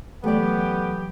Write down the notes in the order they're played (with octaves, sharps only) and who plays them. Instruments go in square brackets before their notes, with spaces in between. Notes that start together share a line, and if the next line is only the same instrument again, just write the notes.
[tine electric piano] E3 F#3 [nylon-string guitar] A3 D5 [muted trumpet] B3 [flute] G4